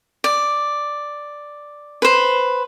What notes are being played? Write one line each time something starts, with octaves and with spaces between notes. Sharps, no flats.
D5
B4 C5